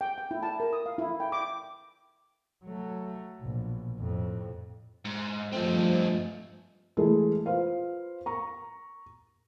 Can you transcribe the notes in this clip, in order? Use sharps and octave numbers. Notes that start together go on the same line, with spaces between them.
G5
G5
E4
A5
A#4
D#6
F5
E4
G5
D6
F#3 A3
A#1 B2
F2 A2
G#2
G2 F3 A3 C4 D#4
E3 G#3 A3 E4 G#4 A4
F4 B4 C5 F5
A#5 C#6